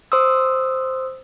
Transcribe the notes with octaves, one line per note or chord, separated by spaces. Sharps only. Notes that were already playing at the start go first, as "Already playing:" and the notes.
C5 C6 D#6 E6